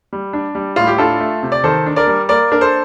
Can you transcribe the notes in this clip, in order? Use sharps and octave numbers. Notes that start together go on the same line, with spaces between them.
G3
D4
G3
A2 F4
G4
D4 F4 A4
A3
C3
D5
D#3 A4 C5
D4
A#4 D5
G3
A#3 A#4 D5
D4 A#4
A4 C5